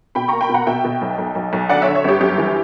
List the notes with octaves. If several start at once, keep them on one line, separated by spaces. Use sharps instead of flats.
B2 G5 B5
A#3 A#5 C#6
G5 B5
B2 F#5 A#5
B2 E5 G5
B2
B1
B1
B1
B1
D3 D5 F#5
C#5 E5
D3
C#5 E5
G1 G4
F#2 G4
E3